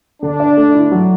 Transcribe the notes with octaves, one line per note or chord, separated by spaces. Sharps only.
D3 D4
D5
A3
E4
F#3